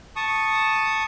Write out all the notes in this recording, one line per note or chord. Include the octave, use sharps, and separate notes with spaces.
A5 C#6 D#6